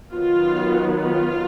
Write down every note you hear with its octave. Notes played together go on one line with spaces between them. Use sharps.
D#3 F#3 B3 F4
F4